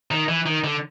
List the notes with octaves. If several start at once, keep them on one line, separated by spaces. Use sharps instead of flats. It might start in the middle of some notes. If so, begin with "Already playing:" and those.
D#3
E3
D#3
D3